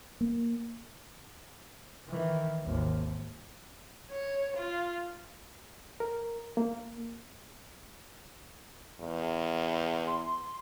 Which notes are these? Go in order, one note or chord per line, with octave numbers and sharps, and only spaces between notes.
A#3
D#3 E3
G#1 D#2
C#5
F4
A#4
A#3
E2
C6